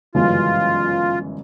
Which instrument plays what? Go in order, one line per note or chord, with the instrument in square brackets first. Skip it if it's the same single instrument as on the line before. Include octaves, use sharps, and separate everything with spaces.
[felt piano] G1 F#2 C#3 E3 G#3 [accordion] F4